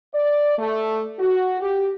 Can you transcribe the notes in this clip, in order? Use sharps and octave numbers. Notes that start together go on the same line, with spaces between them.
D5
A3
F#4
G4